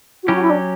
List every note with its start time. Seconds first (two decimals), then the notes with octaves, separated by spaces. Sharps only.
0.23 F#4
0.27 F#3 C#4 E4 G4
0.35 F#4
0.42 E4
0.50 D4